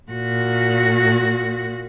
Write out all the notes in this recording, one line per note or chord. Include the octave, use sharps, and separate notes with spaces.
A#2 F#4